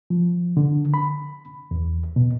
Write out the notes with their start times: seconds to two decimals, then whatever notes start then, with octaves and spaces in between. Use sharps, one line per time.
0.10 F3
0.57 D3
0.94 B5
1.71 E2
2.16 B2